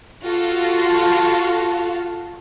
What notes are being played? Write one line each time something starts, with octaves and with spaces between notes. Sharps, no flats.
F4 F#4 A4 F5